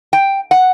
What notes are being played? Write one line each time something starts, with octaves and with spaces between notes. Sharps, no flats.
G5
F#5